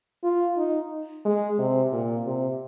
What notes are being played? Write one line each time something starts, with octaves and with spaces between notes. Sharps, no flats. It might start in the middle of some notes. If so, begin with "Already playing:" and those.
F4
D#4
G#3
C3
A#2
C3